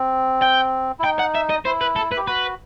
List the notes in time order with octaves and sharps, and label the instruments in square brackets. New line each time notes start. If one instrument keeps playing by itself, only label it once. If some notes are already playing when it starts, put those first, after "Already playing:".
Already playing: [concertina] C4
[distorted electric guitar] G5
[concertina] E4
[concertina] D#4 [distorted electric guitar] G5
[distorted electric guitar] F#5
E5
D#5
[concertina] E4 [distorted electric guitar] C5
[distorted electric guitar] B4
A4
B4
[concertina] G4
[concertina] F#4 [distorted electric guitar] B4